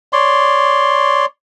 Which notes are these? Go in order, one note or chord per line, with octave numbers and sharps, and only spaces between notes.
C#5 D5 C6